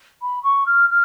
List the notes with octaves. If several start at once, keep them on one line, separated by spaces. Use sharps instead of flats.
B5
C#6
F6
F6